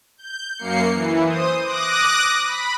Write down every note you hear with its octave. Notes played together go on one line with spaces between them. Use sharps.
G6
F#2 A#3 C7 C#7
E3
C5 D#6
D6 D#6 F#6 A#6
B5